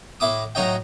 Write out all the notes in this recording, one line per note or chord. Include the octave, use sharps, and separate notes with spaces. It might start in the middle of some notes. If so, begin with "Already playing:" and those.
A2 E4 D6 D#6
A2 F#3 D#4 C#5 D#5 G5